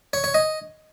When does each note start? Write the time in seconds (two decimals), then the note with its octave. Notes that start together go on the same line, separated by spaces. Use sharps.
0.13 C#5
0.24 C#5
0.34 D#5